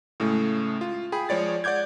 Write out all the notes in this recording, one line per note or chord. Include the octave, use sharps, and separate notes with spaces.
A2 C#3 G#3 A3
F4
G#4 G5 B5
F3 G#3 C#5 D5 A6
D5 F#5 D6 G6 G#6